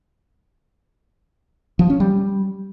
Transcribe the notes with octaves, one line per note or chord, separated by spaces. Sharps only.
F3
C#4
G3